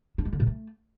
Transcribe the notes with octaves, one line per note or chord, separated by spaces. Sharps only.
D4
G#3
D3
A#2
A3